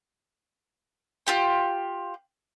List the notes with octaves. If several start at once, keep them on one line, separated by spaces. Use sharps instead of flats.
F4 G4 G5